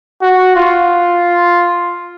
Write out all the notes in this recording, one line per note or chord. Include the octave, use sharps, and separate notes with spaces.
F#4
F4